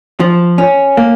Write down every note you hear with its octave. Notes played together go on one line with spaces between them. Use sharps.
F3
C#4
A#3